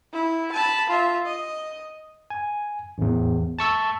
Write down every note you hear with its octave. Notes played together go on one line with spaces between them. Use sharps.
E4
A5 B5
F4 E5
D#5
G#5
A1 E2
A5 C#6 E6